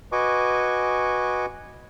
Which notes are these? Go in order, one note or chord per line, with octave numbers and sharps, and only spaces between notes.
F#4 B4 D#5 G#5 C#6 D6